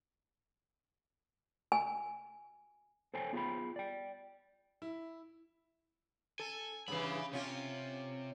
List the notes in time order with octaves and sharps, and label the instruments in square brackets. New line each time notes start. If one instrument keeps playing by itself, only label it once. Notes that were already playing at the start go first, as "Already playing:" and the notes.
[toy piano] G#5
[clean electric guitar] A4 C5 C#5 G5 G#5
B3 F4 G#4 F#5 G5 B5
D5 G5
[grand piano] E4
[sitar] A4 [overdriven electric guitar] G#5
[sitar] G2 C#3 E3 [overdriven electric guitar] F5 B5
[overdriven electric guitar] C3 [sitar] C#4 F4